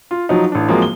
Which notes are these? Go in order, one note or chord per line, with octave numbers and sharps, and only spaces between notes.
F4
F3 F#3 D#4
A1 D4
F3 F#3 G#3 A#3 C4
G7